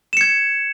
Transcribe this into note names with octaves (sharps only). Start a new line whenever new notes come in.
G#6 C#7 E7